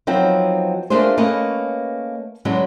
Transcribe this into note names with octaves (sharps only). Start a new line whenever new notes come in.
F3 F#3 B3 C4 D#4
A3 A#3 D4 F4 G#4 C5
A3 A#3 C#4 B4 D#5
D3 F#3 G#3 B3 C#4